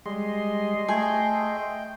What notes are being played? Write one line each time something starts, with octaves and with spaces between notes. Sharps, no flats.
G3 G#3 D#5 C6
A3 G#4 G5